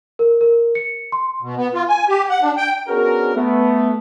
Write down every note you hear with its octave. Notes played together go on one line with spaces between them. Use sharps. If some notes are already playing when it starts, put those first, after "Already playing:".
A#4
A#4
C#7
C6
B2
B3
F4
G#5
G4
F#5
D4
G5
B3 C#4 D4 F#4 G#4 A#4
A3 B3